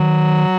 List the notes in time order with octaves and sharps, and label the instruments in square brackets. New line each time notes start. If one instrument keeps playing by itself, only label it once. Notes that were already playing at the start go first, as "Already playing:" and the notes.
Already playing: [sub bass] D#3 [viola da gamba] F#3